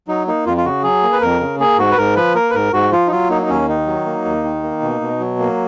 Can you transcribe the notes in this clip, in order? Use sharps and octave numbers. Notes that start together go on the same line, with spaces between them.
F#3 D#4
A#3 D#4
F2 F4
F4
C#3 F#4
F#3 G#4
A#3
B4
F2 A#4
C#3
A#3 G#4
G#2 F#4
B4
G#2 A#4
F3 B4
A#3 A#4
B4
G#2 A#4
G#2 F#4
F3 F4
D#4
F#3 F4
A#3 D#4
D#4
D#2 C#4
D#3 D#4
F#3
A#3
D#2
D#3
A#3
B2
B2
F#3
A#3